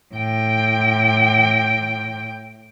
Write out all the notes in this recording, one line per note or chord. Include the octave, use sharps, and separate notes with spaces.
A2 G5